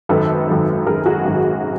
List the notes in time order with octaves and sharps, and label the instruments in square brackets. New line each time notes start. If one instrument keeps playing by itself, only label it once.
[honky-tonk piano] G#1 F#2 D#3 A4 B4
G#1 F#2 D#3
G#1 F#2 D#3 G#4 A#4
F#4 G#4
G#1 F#2 D#3